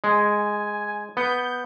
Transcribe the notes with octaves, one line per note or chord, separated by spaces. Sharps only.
G#3 G#5
B3 G6